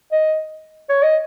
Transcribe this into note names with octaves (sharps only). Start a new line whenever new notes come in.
D#5
C#5
D#5